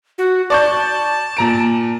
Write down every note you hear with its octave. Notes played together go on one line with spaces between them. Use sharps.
F#4
D5 A5 C#6 G6
A#2 A#5 D7